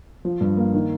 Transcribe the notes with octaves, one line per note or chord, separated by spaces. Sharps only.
F3
G2
A#3
D#3